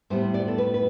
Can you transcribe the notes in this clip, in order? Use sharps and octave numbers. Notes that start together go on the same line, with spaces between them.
A2 G3 B3 C5
D5
A4
B4
B4